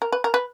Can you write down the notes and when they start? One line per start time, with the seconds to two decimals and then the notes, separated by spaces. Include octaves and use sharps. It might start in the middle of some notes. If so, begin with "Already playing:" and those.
0.02 A#4
0.12 B4
0.24 A#4
0.34 B4